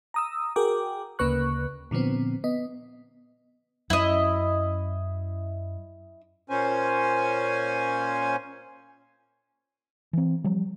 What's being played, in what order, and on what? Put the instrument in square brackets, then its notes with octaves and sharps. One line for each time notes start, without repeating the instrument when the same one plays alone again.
[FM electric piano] A#5 D#6 E6
F#4 G#4 A#4 G5 D6
D2 C#3 A#3 B4 C#6 F#6
A#2 D3 F3 B3 C4
B3 D#5
[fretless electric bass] F#2 C#4 [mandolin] E4 D#5
[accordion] A#2 C#4 C5 G#5
[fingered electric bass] E3 C4
F3 G3